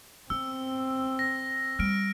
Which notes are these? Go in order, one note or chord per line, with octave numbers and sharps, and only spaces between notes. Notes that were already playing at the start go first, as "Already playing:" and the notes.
B3 C4 E6
A#6
G3 F6 D7